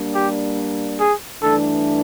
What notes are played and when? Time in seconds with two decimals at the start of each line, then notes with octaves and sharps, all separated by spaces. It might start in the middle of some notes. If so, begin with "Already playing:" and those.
Already playing: G3 A#3 D4
0.15 G4
1.00 G#4
1.42 G2 E3 A3 D4 A4